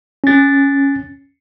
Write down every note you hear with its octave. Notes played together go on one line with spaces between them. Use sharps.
C#4 A6